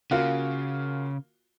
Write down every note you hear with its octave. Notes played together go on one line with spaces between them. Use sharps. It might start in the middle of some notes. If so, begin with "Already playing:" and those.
C#3 A#3 F4 F#4